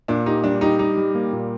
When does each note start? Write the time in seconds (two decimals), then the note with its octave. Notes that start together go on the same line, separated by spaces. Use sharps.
0.08 A#2 D4
0.26 D#4 G4
0.44 G3 D4
0.61 D#4 G4
0.79 G3 D#4
0.97 G3
1.15 A#3
1.33 A#2